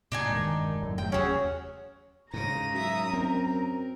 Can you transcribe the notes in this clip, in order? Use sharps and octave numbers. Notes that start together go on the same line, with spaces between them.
A#2 D4 D#4 G#5
E1 G2 D#3 G#3
F1 F#2 A2 A3
F3 F#3 G5
E1 D#2 F#3 C#4 G#4 F#5
G#2 C#3 A#5 A#6 D#7
F#2 E5 D#6
C4 A#4